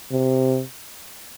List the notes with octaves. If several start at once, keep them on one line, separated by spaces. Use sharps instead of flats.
C3